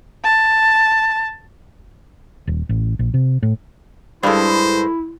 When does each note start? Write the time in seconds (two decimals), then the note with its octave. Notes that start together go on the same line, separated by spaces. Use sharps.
0.24 A5
2.47 D#1
2.69 A1
2.99 A#1
3.14 C3
3.43 A2
4.23 G2 G3 G#3 E4 A4 C5